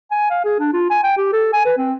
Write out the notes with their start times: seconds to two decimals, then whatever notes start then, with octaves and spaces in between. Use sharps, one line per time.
0.11 G#5
0.30 F5
0.45 G#4
0.59 D4
0.73 F4
0.90 G#5
1.04 G5
1.17 G4
1.33 A4
1.53 G#5
1.65 B4
1.78 C4